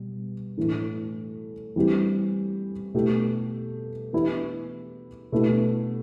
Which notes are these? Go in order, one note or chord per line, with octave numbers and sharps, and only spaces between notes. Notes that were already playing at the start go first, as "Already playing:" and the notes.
Already playing: B2 G3
A2 E3 A3
E3 G3 C4 E4 G4
B2 A3 E4 G4
E3 B3 E4 G4
B2 A3 E4 G4